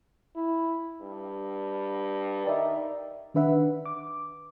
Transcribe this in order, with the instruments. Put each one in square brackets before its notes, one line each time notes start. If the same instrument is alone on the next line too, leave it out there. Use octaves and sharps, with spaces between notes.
[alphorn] E4
G2
[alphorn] D#3 [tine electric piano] D5 E5
[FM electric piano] D#3 D4 B4 E5 F#5
D6